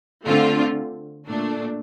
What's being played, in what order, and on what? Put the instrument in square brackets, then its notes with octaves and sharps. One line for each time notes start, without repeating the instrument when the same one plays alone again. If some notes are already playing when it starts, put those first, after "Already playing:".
[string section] D3 A3 C4 F4
A#2 A3 D4